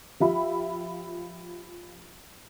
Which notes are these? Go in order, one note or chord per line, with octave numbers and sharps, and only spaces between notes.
F3 F4 G4 E5 B5